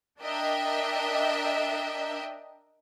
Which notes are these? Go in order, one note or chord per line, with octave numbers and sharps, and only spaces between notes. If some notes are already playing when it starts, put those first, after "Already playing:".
D4 A#4 D#5 E5 G5